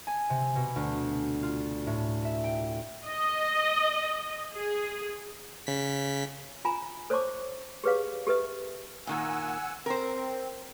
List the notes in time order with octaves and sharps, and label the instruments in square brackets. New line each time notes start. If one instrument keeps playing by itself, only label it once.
[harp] G#5
C3
B2
D2
F4
A2
E5
G5
[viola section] D#5
G#4
[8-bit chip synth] C#3 B6
[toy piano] F4 G#5 A#5 B5
A4 C5 C#5 A5 C#6 D6
G4 G#4 B4 C#5 F5
G4 A4 B4 E5
[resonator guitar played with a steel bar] A#2 D#3 A#3 [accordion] F#5 G#5 E6
[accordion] C4 [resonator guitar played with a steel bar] A#4 C5